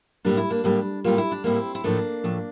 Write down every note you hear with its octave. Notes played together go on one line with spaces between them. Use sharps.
A2 G3 A#3 D4
E4
A#3 D4
A2 G3 A#3
A2 G3 A#3 F4
E4
D4
A2 G3 A#3 C4 E4
E4
A2 F3 A3 A#3 D4
A2 F3 A3